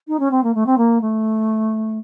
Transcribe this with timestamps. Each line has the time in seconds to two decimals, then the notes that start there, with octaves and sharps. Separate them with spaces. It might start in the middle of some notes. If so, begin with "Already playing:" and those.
0.08 D#4
0.20 C#4
0.31 C4
0.44 A#3
0.55 A3
0.66 C4
0.78 A#3
1.01 A3